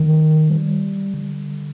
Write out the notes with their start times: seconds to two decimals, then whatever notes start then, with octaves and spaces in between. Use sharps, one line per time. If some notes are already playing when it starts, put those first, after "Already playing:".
Already playing: D#3
0.50 G3
1.14 D3